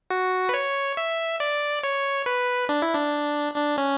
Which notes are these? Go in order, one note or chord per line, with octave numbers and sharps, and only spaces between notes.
F#4
B4
C#5
E5
D5
C#5
B4
D4
E4
D4
D4
C#4